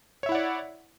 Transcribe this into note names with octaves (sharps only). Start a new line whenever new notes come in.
E4 C#5 D5 E5 F#5